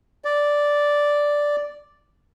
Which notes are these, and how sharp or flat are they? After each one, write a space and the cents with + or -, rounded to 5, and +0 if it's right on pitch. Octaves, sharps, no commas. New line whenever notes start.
D5 -5